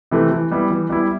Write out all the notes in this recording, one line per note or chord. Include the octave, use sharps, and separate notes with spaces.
C3 E3 A3
E3
G3 B3 E4
E3
G3 B3 E4